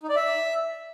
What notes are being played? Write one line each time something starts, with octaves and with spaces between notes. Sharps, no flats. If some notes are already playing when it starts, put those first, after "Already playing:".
D#4
D5
E5